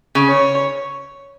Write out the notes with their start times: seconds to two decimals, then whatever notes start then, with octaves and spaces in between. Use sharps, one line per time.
0.15 C#3
0.28 C#5